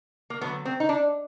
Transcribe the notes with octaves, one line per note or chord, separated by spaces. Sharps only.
A#3
D3 F#3 A3 B3
C4
D#4
D4